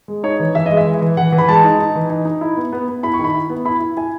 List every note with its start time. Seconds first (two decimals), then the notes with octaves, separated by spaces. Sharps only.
0.08 G#3
0.23 D#4 C#5
0.40 E3
0.55 E3 E5
0.66 G#3 D#5
0.77 E5
0.87 E3
1.02 E3
1.17 E3 F#5
1.32 E3
1.38 B5
1.48 G#3 A5
1.64 D#4
1.79 D#4
1.95 E3
2.10 D#4
2.25 D#4
2.41 E4
2.57 B3
2.72 B3
2.88 B3
3.03 E4 B5
3.13 C#6
3.19 D#3
3.24 B5
3.34 E4
3.50 B3
3.65 E4 B5
3.80 E4
3.97 E4 G#5